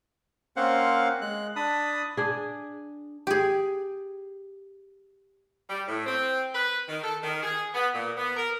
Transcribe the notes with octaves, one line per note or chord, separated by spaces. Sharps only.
A#3 C4 C#4 C5 F5 F#5
G#3 F#6
D4 A5 B5 D#6
D4 G#4
G4 G#4
G3
A2
C4
B4
D#3
A4
D#3
G#4
B3
A#2
B3
A#4